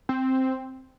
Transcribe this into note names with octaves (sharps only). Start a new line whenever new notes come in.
C4